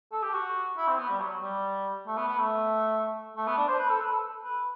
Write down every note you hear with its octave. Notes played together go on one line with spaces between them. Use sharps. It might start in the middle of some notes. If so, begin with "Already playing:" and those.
A4
G4
F#4
E4
C4
B3
G3
F#3
G3
A3
B3
B3
A3
A3
B3
D4
C5
B4
A4
B4
A4
B4